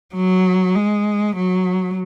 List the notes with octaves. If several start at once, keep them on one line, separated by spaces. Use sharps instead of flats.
F#3
G#3
F#3